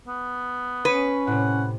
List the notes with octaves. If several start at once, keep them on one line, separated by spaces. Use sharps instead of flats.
B3
C#4 B4 C#5 D#7
A2 C3 F#5